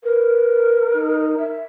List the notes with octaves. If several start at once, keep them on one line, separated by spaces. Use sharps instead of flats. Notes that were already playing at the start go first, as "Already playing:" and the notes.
A#4 B4
D#4
E5